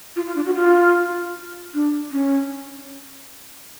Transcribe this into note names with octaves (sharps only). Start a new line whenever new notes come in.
F4
F4
D4
F#4
F4
D4
C#4